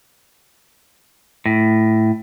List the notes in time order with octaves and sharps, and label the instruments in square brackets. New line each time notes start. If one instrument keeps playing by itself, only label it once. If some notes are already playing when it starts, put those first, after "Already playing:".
[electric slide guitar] A2